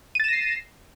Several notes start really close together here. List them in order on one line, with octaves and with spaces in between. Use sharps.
D#7 A6 E7 A#6 C7